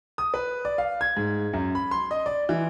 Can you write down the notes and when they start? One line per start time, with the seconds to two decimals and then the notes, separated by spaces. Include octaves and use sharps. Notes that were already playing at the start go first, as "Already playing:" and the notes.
0.18 D#6
0.34 B4
0.65 D5
0.78 F5
1.01 G#6
1.16 G#2
1.53 F#2
1.75 B5
1.91 C6
2.11 D#5
2.26 D5
2.49 E3